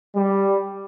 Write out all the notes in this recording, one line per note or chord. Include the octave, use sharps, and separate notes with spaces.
G3